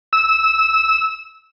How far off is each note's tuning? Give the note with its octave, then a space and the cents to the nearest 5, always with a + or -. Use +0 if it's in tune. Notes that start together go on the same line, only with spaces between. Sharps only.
E6 -15